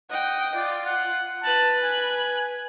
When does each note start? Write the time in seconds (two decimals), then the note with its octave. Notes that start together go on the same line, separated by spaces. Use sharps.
0.10 D#5 F#5 G5
0.55 F4 D5
0.86 F#5
1.44 B4 A5 F#6
1.83 G#5